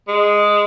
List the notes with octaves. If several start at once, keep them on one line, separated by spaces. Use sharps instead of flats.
G#3